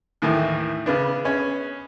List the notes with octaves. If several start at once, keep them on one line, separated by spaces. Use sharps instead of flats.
D#2 A2 D#3 E3 A3
C#3 B3 D4
B3 C#4 G#4